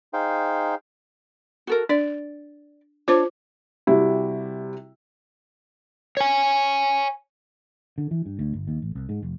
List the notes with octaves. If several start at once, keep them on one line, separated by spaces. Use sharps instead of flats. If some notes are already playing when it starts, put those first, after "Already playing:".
D#4 G#4 C5 F5 G5
F#4 A4 A#4
D4 D5
D4 F4 C5 C#5 D6
C3 G3 E4 F#4
C#5 G#5
D3
E3
G2
D2
G1
D#2
A1
C2
G#2
F1